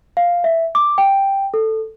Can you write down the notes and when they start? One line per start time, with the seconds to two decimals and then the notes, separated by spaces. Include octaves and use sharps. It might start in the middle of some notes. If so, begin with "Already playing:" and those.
0.17 F5
0.44 E5
0.75 D6
0.98 G5
1.54 A4